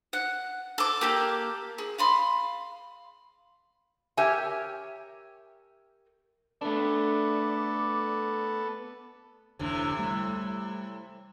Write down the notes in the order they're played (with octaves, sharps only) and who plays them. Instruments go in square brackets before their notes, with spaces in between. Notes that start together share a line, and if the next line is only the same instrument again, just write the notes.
[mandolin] F#5
A4 D6
A#3 G4 A4
G#4
F5 B5 C6
[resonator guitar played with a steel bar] G4 A#4 C#5 E5 G5 G#5
[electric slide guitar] A3 D4 [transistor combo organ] B3 A4 [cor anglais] D5
[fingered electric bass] F1 D2 D4 [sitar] A2 C3 E3
[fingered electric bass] G3 A3